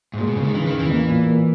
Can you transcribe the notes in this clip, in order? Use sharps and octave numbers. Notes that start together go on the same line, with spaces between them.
G#2
A#2 G#3
B2
C#3 G#3
D#3
C#3 E3
D#3
E2
E3
A#3
A#2
A#3